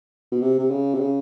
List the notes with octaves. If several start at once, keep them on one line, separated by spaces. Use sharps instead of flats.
B2
C3
C3
C#3
C3
C#3